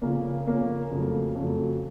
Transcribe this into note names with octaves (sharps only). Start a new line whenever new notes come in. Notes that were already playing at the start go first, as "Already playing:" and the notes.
C#3 F3 A#3 C#4
C#3 F3 A#3 C#4
F2 C#3 F#3 A3
F2 C#3 F#3 A3